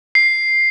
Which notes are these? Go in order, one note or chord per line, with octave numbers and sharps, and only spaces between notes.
C7